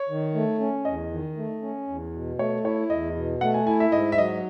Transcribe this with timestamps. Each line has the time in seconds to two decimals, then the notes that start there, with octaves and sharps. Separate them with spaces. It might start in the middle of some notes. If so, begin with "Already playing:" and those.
Already playing: C#5
0.09 D#3
0.34 A3
0.60 C#4
0.85 E2 D#5
1.11 D#3
1.37 A3
1.62 C#4
1.88 E2
2.13 B2
2.39 A3 C#5
2.64 E4 C#5
2.90 E2 D#5
3.15 B2
3.41 A3 F#5
3.54 G#5
3.67 E4 G#5
3.80 E5
3.92 G#2 D#5
4.12 E5
4.18 F#3 D#5